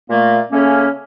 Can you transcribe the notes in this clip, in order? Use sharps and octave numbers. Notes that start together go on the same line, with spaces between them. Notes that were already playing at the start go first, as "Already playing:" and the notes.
A#2 A3 A#3
C#3 A3 A#3 C#4